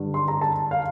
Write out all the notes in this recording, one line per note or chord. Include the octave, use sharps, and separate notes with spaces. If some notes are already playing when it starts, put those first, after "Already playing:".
Already playing: G2 D3
C6
A#5
A5
F5